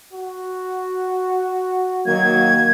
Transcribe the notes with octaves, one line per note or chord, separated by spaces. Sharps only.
F#4
D#3 F#3 A#3 G#6